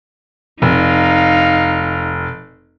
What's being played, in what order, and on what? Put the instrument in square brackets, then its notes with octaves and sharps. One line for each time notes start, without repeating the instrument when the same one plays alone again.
[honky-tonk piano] F1 [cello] D#4 F5